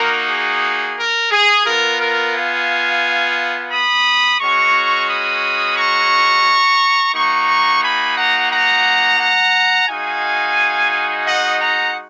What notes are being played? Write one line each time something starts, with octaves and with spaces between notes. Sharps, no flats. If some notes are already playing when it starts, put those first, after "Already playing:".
Already playing: A#3 D#4 F#4 A#4
G#4
A#4
G#4
B3 F4 A#4
A#4
F5 G#5
B5 D#6
G#3 C#4 F#4 A#5 C#6
B5 D#6
A#5 C#6
A#3 D#4 F#4 A#5 C#6
G#5 B5
F#5 A#5
F#5 A#5
F#5 A#5
G#3 D#4 F#4 F5 G#5
D#5 F#5
F#5 A#5